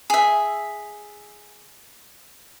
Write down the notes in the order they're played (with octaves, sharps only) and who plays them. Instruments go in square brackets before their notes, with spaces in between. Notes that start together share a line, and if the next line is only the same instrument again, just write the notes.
[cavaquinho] G#4 E5